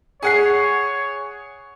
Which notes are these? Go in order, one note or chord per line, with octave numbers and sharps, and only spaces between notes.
G#4 C#5 F#5 C7